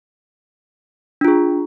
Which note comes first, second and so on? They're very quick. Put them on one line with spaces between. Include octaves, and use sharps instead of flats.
D4 F4 G#4